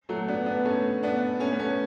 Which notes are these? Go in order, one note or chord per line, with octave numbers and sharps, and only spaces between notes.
F#3 A3
B3 D4
B3 D4
A3 C#4
B3 D4
A3 C#4
B3
A3 C#4